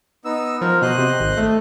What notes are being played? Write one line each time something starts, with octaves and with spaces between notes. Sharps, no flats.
B3 D#4 E6
F3 A#4
B2 C5 D#5 F#6
C3
G#1
A3